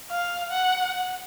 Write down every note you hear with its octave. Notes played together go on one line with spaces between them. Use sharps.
F5
F#5